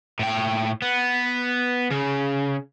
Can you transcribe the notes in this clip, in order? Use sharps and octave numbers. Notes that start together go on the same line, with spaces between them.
A2 G5
B3
C#3